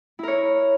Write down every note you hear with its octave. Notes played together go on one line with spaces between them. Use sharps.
E4 A#4 C#5